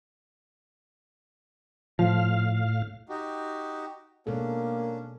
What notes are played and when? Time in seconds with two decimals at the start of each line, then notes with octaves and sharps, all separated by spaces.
1.99 A2 F3 F5
3.09 D#4 F#4 G4
4.27 B2 G#3 A#3 C#4 D4 A4